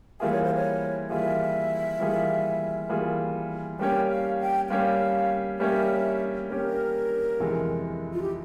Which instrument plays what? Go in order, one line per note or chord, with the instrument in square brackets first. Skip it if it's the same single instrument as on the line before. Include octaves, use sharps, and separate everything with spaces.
[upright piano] E3 G3 A#3 F4 G#4 [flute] E5
[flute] C#5
C5
C#5
[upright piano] E3 G3 A#3 F4 G#4 [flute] E5
[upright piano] E3 G3 A#3 F4 G#4
E3 G3 A#3 F4 G#4
[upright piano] G3 A#3 C#4 G4 C#5 [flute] G5
[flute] F5
G5
[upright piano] G3 A#3 C#4 G4 C#5 [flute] F5
[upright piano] G3 A#3 C#4 G4 C#5 [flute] E5
[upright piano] G3 A#3 C#4 G4 C#5 [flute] A#4
[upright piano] F2 C3 E3 G#3
[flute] F4
G4